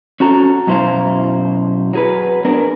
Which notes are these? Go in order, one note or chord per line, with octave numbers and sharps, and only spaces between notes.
C#4 F#4 A4 A#5
F#2 B2 E4 C5 F5 A#5
F#3 G#4 B4
B3 D4 G#4 A#4